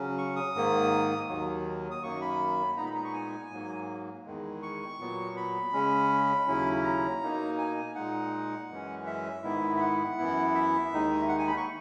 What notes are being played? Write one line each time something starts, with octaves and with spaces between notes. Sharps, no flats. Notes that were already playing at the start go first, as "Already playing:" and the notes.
Already playing: C#3 F#3 C#4
C#6
D#6
G#2 D#3 A#3
D#2 D#3 F#3
D#6
F#2 D#3 F#3 A#3 C#6
B5
A#2 G#3 B3 D#4 A#5
B5
A#5
C#6
G#5
G#2 F#3 A#3
E2 D#3 G#3
C#6
A#2 F#3 B3
B5
C#3 G#3 C#4
D#2 C#3 F#3 C#4 E4
A#5
B2 A#3 D#4
G#5
A#2 G#3 D#4 F#5
F#2 E3 G#3 C#4
E5
G#2 D#3 G#3 B3 E4
E5
F#5
F#2 E3 B3 E4
E5
D#2 D#3 G#3 D#4
F#5
G#5
B5
C#6